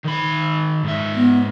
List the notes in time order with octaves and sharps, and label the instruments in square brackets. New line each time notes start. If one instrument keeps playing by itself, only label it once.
[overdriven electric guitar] D#3 B5
G#2 E5
[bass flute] B3